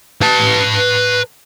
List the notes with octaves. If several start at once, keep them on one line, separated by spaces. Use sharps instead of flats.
B4 A5